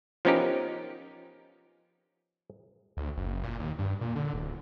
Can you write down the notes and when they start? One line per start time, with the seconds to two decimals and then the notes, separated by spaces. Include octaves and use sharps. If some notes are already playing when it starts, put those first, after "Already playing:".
0.25 F3 B3 C#4 D#4 G4 A#4
2.97 D2
3.17 F#1
3.43 A#2
3.59 D#2
3.79 G2
4.01 A#2
4.16 D3
4.34 D1